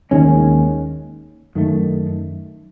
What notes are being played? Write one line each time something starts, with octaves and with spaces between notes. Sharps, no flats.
D#2 D#3 G#3 C#4
F#2 D#3 A3